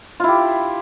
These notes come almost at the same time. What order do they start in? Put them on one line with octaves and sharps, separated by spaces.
F4 E4 G4